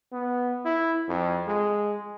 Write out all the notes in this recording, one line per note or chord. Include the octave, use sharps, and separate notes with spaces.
B3
E4
F2
G#3